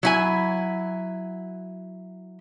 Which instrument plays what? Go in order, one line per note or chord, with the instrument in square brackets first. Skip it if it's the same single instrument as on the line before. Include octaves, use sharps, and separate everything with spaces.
[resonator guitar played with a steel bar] F#3 E4 G#5